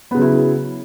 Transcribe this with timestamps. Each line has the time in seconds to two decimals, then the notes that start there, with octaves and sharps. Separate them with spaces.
0.11 B3
0.15 C#3
0.18 F#3
0.22 E4